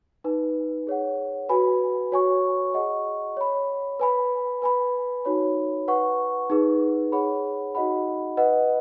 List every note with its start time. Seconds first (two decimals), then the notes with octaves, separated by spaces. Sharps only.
0.24 D#4 B4 G#5
0.87 G#4 C#5 F#5
1.49 F#4 B4 G#5 B5
2.12 F#4 C#5 G#5 C#6
2.74 G#4 D#5 F#5 C#6
3.37 C#5 B5
4.00 B4 G#5 B5
4.62 B4 G#5 B5
5.25 D#4 F#4 C#5 B5
5.88 B4 F#5 C#6
6.50 D#4 G#4 B4
7.12 G#4 C#5 F#5 B5
7.75 D#4 F#4 D#5 F#5 B5
8.37 B4 D#5 F#5